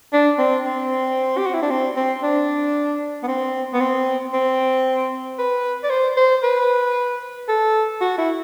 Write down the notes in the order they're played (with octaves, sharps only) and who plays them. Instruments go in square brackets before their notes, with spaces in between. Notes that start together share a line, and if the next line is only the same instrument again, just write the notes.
[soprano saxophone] D4
C4
C4
G4
F#4
E4
D4
C4
C4
D4
B3
C4
B3
C4
C4
B4
D5
C5
C5
B4
A4
F#4
E4